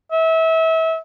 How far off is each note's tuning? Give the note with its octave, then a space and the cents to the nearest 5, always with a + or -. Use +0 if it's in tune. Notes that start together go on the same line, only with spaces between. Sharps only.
E5 -30